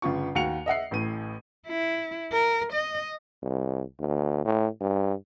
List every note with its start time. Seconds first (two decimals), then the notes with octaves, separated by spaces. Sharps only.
0.02 G1 C#3 F4 C#6
0.35 D#2 F#4 C#7 F7
0.66 D#5 E5 F#5 C7
0.91 A1 A2 D#7
1.68 E4
2.32 A#4
2.73 D#5
3.43 C2
4.00 D2
4.45 A2
4.81 G2